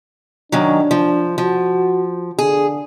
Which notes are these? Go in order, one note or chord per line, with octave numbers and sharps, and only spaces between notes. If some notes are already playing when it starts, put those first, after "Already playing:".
F#2 D#3 F#3 D4
F3
F3 F#4
D3 G#4